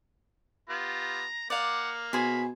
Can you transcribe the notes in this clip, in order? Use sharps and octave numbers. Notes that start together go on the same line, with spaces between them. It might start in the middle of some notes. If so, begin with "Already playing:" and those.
B3 F4 G4 A#5
A#3 D5 F5 F#5
B2 G#4 C5 G#5 B5